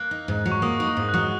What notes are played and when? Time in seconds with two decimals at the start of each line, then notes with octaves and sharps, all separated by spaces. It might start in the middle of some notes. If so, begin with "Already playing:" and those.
Already playing: A#3 F#6
0.11 D#4
0.28 G#2
0.46 F#3
0.52 C#6
0.62 A#3 D#6
0.80 D#4
0.89 C#6
0.97 G#2
1.09 F#6
1.14 F#3 D#6